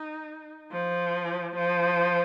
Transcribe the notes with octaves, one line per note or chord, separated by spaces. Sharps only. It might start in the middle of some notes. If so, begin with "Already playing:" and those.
Already playing: D#4
F3
F3